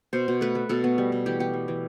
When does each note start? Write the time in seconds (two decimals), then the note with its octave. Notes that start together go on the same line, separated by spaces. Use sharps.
0.13 B2 C5
0.28 B2
0.41 A3 B4
0.55 A3
0.69 B2 A4
0.84 B3
0.98 G3
1.12 B2
1.26 E3 G4
1.39 B3 G4
1.53 G3
1.68 E3